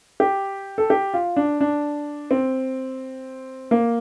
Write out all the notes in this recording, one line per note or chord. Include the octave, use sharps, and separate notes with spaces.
G4
A4
G4
F4
D4
D4
C4
A#3